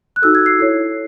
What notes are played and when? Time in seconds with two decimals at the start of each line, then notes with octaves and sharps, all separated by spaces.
0.16 F#6
0.22 D#4 F#4 A4 E6
0.35 G#6
0.46 C7
0.59 E4 A4 C#5